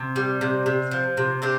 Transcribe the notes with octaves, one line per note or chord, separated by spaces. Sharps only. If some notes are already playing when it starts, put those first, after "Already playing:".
Already playing: C3
G3
C3
C3
F3
C3
C3 D4 G4